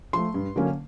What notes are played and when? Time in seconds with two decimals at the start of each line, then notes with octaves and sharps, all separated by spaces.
0.13 F3 A3 C6
0.34 G2
0.56 D3 F#3 A#3 C#4